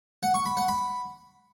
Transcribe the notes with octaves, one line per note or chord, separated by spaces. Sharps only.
F#5
C#6
B5
F#5
B5